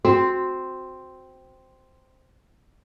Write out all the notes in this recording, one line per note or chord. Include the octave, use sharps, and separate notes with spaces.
C4 F#4